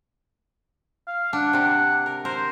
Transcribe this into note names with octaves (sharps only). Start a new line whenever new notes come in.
F5
D4 F#5
C3 D4
A#4
A#4 C5